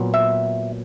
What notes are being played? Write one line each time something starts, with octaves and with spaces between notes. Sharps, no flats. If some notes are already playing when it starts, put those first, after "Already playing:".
Already playing: A#2 F#3 B3
E5